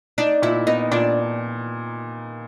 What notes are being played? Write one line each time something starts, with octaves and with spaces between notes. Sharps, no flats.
D4 D#4
A#2 E4
B3 D#4
A#2 D4